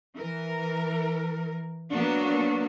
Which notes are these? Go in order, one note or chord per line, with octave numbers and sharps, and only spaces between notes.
E3 A#4
F#3 A#3 B3 D4 F#4